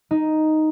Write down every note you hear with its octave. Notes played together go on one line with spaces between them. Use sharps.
D#4